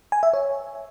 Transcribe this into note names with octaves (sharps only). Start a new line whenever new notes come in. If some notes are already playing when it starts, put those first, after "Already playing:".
G#5
E5
C#5